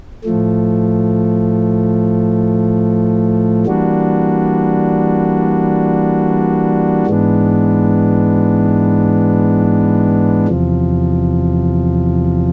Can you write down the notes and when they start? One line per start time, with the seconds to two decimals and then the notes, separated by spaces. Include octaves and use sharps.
0.24 A2 F3 A3
3.66 E3 G3 A#3 D4 F#4
7.07 G#2 E3 G#3 B3 D4
10.48 E2 C3 F3